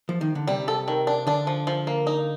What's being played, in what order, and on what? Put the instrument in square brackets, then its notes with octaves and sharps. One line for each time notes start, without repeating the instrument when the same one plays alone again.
[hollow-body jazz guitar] F3
D#3
D3
[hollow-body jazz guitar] C3 [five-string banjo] G3
[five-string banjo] A4
D#3
D4
[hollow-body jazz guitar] D3 [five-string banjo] D4
[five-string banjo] F3
F3
A#3
D#4